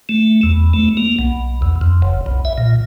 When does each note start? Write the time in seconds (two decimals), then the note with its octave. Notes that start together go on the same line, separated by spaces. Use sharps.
0.09 A3
0.43 E2
0.74 A3
0.97 A#3
1.19 B1
1.62 E2
1.81 F2
2.02 F#1
2.26 B1
2.45 E5
2.58 A#2